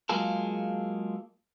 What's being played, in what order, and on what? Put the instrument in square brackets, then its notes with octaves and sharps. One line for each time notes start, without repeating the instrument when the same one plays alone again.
[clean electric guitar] F#3 G#3 A#3 F4 G#4 A4